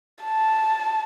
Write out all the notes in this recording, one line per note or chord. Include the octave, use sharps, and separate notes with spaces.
A5